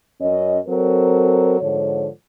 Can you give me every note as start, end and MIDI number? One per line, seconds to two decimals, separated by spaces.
0.20 0.58 42
0.20 0.58 61
0.20 0.58 75
0.68 1.60 54
0.68 1.60 60
0.68 1.60 69
0.68 1.60 70
1.61 2.08 44
1.61 2.08 50
1.61 2.08 53
1.61 2.08 73